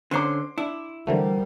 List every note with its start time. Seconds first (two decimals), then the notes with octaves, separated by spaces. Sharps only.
0.11 D3 C#4 C5 C6 D6
0.58 D4 E4
1.07 D3 E3 G3 A3 A#4 C5 F#5